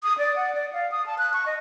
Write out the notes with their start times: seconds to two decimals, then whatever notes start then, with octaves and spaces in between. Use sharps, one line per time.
0.03 D#6
0.18 D5
0.36 F#5
0.55 D5
0.73 F5
0.91 D#6
1.06 A5
1.18 F#6
1.33 C#6
1.46 D#5